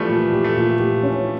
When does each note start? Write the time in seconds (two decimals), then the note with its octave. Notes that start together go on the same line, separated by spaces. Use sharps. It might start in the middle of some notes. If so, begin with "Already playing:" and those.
Already playing: E3 F3 G3 A3
0.09 A#2
0.32 G4
0.44 A3
0.57 A#2
0.79 G4
1.03 C#4